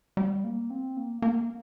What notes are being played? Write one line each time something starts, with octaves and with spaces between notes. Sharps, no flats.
G3
A#3
C4
A#3
A#3